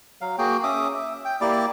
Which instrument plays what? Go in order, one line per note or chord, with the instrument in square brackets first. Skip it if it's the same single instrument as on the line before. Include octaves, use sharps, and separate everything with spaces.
[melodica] F#3 F5
A#3 F#4 G#4 G5
C#4 E5 D6 D#6
E5
G5
A#3 E4 G4 D5